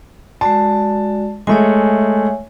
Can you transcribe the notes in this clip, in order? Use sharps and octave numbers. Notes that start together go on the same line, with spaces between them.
G#3 F#4 D5 A5
G#3 A3 C#5 E5 G#5